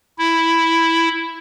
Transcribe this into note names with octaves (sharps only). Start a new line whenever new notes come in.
E4